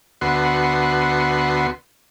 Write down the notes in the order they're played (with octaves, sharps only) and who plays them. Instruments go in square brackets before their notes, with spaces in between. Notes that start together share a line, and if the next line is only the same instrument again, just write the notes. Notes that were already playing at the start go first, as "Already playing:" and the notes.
[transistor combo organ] D2 B3 F#4 C6